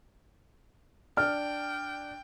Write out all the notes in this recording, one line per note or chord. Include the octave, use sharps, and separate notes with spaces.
D4 G5 F6